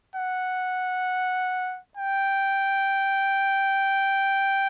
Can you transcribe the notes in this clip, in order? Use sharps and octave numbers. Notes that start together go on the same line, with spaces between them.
F#5
G5